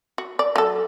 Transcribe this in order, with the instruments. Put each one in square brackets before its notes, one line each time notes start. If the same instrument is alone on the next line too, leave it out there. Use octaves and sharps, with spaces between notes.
[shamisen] F#4
D5
F#3 A4